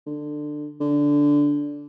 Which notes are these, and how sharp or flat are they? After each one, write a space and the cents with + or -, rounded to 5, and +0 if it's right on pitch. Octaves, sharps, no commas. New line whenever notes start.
D3 +20
D3 -10